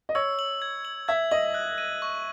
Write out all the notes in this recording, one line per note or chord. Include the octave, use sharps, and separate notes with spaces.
D#5
C#5 E6
F#7
G#6
F#7
E5 G#6
D#5 F#7
F#6
D#7
C#6